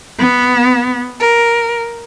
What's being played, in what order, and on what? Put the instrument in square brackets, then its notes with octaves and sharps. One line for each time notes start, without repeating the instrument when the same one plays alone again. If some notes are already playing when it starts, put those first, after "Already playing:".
[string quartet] B3
A#4